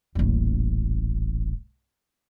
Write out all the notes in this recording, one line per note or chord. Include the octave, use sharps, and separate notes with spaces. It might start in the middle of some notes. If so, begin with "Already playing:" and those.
D#1 A1